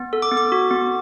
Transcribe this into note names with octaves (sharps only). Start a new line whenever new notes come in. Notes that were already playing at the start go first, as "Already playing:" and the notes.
Already playing: B3
A4
D6
B3
D6
F#4
B3